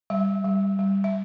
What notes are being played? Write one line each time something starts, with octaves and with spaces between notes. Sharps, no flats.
G3 E5
G3
G3
E5